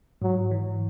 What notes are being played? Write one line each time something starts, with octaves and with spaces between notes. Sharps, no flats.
G#2 F#3
E3